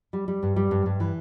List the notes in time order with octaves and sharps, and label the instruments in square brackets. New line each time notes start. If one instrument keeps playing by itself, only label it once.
[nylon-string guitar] G3
G3
G2
G3
G2
G2
E3